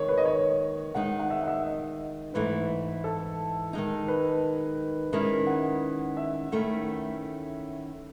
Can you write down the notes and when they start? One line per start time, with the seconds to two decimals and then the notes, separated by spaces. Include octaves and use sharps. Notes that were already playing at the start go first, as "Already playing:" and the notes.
Already playing: D#2 D#3 G#3 C#5
0.09 B4
0.18 D#5
0.25 C#5
0.95 D#3 G#3 D#4 F#5
1.20 F#5
1.30 E5
1.43 F#5
1.48 E5
1.65 D#5
2.34 G#2 E3 A3 E4 B4
3.04 A4
3.73 D#3 G#3 D#4
4.08 B4
5.13 D#3 G#3 C#4 E4
5.47 F#5
6.17 E5
6.52 D#3 A3 C#4 E4